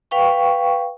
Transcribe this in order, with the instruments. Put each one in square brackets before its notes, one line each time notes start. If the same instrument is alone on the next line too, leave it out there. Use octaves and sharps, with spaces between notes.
[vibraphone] B4 F5 G5 C#6